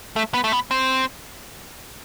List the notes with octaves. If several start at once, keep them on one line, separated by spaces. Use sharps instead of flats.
A3
B3
A3
B3
C4